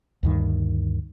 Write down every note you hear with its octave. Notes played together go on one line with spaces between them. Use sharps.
D2 G2 D#3